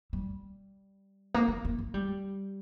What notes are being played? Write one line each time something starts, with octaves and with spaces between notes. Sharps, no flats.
G3
A#3
A#3
A#3
A#3
G3